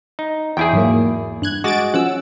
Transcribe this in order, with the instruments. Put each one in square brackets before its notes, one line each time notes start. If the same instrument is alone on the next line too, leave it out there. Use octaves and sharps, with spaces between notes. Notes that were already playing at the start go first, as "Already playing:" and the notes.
[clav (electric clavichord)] D#4
[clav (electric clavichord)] E2 E4 G#4 [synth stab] G5
[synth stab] G#2 F#3 A#3
G2 F#6 G#6
[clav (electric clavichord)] G#3 F#4 [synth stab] D6 A6 D7
[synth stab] F3 C#4 E6 [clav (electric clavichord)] F#5